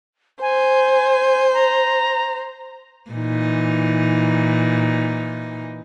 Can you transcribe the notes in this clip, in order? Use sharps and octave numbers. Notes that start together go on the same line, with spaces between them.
C5 G#5
A#5
A#2 E3 D#4